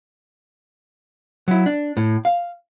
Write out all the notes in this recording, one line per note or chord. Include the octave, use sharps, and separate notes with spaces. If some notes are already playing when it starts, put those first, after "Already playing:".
F#3 E4
D4
A2
F5